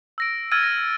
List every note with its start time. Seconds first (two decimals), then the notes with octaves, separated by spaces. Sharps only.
0.18 E6 A#6 D7
0.52 E6 F6 G#6 A6 D#7
0.63 A#6